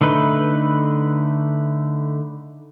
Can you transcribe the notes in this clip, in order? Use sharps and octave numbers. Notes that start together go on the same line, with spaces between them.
D3 A3 D#4 B4